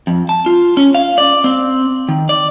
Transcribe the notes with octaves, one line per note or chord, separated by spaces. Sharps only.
F2
A5
F4
C#4
F5
D5
C4
D#3
D5